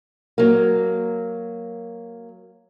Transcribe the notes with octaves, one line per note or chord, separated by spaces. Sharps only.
F#3 A#3